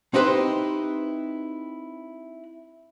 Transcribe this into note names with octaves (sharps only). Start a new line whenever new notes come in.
C4 D#4 E4 G4 B4 C5